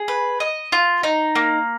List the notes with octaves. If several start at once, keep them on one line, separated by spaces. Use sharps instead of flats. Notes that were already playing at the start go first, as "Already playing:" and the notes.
Already playing: G#4
B4
D#5
F4
D#4
A#3